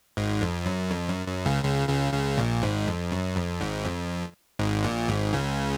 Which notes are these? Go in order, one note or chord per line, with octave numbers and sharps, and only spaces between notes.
G#1 G#2
F2
F#2
F2
F#2
F#2
C#2 C#3
C#2 C#3
C#2 C#3
C#2 C#3
A#1 A#2
G#1 G#2
F2
F#2
F2
G#1 G#2
F2
G#1 G#2
A#1 A#2
G#1 G#2
C#2 C#3